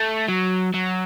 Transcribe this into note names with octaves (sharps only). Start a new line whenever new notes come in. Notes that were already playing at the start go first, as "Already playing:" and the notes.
Already playing: A3
F#3
F#3